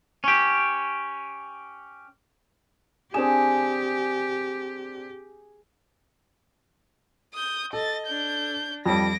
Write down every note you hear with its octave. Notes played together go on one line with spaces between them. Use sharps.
C#4 G4
C4 D4 G4 G#4 E7
D#6 G6
A4 D#5 A6
D4 G6
F2 G3 A#6 D7